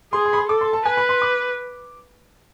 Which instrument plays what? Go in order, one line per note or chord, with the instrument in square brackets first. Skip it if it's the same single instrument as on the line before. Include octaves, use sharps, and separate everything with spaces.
[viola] G#4 [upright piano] C6
[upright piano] C6
B5
C6
[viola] A4 [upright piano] D6
[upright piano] C6
A5
[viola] B4 [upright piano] G#5
[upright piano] B5
C6
D6